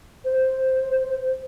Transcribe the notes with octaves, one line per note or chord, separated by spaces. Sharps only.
C5